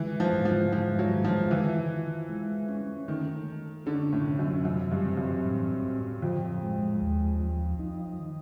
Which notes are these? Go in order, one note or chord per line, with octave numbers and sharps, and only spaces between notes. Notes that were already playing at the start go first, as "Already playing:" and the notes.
Already playing: E3 G#3
F3
G#2
F3
F3 G#3
F#3
D#3
F3
E3 E4
E4
G#3
C#4
D#3 A3
A3
D3 C#4
A2
C3
F#2
F#2 E3
G2
C4
F#2
A2
A2
F2 F3
G#3
D#2
F3
D#4
D#3